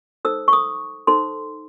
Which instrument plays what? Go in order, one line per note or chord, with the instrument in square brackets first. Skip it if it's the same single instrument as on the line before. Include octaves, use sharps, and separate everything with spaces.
[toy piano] D#4 A4 C5 E6
C#6
D#6
D#4 A4 C5 C6